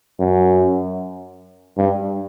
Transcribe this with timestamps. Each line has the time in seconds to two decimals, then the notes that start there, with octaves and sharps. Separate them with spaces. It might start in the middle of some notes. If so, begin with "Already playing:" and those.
0.20 F#2
1.78 G2